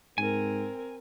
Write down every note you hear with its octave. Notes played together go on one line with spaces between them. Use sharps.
G#2 C4 A#4 G#5